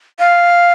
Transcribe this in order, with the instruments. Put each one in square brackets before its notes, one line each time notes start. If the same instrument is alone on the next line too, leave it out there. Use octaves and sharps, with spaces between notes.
[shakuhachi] F5